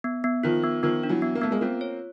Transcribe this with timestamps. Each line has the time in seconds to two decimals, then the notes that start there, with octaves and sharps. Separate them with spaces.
0.04 B3
0.24 B3
0.44 D#3 F3 F4
0.64 B3
0.83 D#3 F3 B3
1.03 D4
1.09 E3 F#3
1.22 B3
1.35 A#3
1.41 A3 B3
1.51 G#3 A#3
1.61 A#3 C4 F4
1.81 C#5